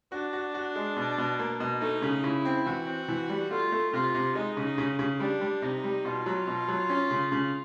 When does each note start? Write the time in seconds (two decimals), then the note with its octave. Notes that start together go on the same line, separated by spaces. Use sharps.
0.12 D4 F#4
0.33 F#4
0.54 F#4
0.76 G#3
0.97 B2
1.18 B2
1.39 A#3
1.60 B2
1.81 A3 D#4
2.02 C#3
2.23 C#3 E4
2.45 C4
2.66 E3 F#4
2.87 C4
3.08 E3
3.29 G3
3.51 A3 F4
3.72 A3
3.93 C3 F4
4.14 C3
4.35 G#3 D#4
4.57 C#3
4.64 D#4
4.78 C#3
4.99 C#3
5.20 G3 D4
5.41 G3
5.62 C3 D#4
5.84 G3
6.05 B2 F4
6.26 F#3
6.47 B2
6.68 F#3
6.90 C#4
7.11 C#3
7.32 C#3